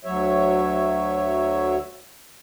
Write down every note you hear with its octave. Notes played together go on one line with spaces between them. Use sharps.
D2 F#3 C#5 E5